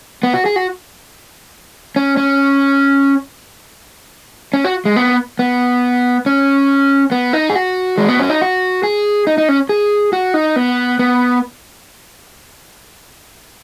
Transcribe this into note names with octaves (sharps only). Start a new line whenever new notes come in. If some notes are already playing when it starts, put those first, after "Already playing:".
B3
F#4
G#4
F#4
C#4
C#4
C#4
F#4
G#3
B3
B3
C#4
B3
D#4
G#4
F#4
G#3
B3
C#4
D#4
F#4
G#4
D#4
D#4
C#4
G#4
F#4
D#4
B3
B3